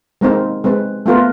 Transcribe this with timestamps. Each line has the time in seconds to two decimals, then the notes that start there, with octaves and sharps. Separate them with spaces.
0.21 G#3 A#3 C4 D#4 A#4
0.64 G#3 C4 B4
1.06 A3 B3 F4 A#4 B4